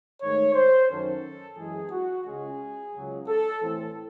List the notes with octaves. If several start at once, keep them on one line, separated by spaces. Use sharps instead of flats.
G#2 D#3 A3 C#5
C5
F#2 D#3 F#3 C#4 A4
F#2 E3 G#3 G#4
F#4
C#2 C#3 G#3 C#4 G#4
C#2 C#3 F#3
A4
A2 E3 C4 A4